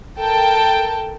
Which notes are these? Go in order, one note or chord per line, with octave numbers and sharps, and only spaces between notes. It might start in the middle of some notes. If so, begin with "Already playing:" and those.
A4 A#4 G5 A5